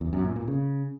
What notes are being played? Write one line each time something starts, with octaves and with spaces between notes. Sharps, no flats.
E2
F#2
A#2
A#2
C#3